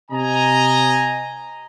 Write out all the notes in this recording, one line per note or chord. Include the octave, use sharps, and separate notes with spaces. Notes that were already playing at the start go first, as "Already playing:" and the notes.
C3 D#5 G#5 A#5